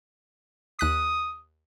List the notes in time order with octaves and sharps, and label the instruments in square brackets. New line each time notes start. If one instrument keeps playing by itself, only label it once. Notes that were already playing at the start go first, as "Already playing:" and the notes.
[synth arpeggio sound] D#2 F#6 B6 [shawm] D#6